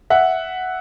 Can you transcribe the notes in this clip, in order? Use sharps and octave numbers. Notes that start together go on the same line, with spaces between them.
E5 F#5